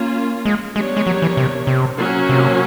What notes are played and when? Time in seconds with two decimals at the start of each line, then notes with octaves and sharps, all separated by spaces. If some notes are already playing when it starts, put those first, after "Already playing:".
Already playing: A#3 C#4 F4
0.45 G#3
0.75 G#3 B3 D4 G4 A#4 C#5
0.97 G#3
1.07 F#3
1.22 E3
1.37 C3
1.67 C3
1.98 F#3 A#3 C#4
2.29 C3